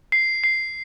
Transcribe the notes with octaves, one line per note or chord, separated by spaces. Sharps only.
C7
C7